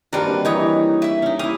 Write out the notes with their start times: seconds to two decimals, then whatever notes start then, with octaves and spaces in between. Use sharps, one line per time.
0.13 D#3 G3 A#3 C4 D4 F#4 A#4 B4
0.45 E3 D#4 C#5 D#6
1.02 E4 E5
1.22 C#4 D#4
1.39 E4 G4 F5 D#6